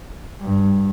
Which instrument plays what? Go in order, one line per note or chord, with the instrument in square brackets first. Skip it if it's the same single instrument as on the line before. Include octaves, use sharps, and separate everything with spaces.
[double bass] G2